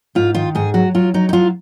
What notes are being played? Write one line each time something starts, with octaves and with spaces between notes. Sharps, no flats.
G#2 F4
D#3 F4
G#2 G#4
F#3 F#4
F#3 F4
F#3 D#4
D#4
F#3 F4